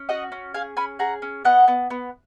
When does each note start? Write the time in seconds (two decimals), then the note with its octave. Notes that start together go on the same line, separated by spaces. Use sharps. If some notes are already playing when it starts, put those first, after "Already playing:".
Already playing: C#4
0.09 F#4 D#5 F#5
0.32 C#4
0.54 G#4 F5 G#5
0.77 C#4 G#5 B5
0.99 G#4 F#5 A#5
1.22 C#4
1.45 B3 D#5 F#5
1.68 B3
1.90 B3